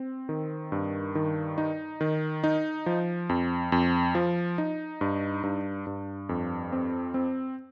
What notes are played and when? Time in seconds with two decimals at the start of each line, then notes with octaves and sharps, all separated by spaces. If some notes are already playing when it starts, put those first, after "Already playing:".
Already playing: C4
0.29 D#3
0.72 G2
1.15 D#3
1.58 D#4
2.01 D#3
2.44 D#4
2.86 F3
3.29 F2
3.72 F2
4.15 F3
4.58 D#4
5.01 G2
5.43 G2
5.87 G2
6.29 F2
6.72 C4
7.14 C4